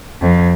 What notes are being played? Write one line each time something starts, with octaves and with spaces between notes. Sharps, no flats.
F2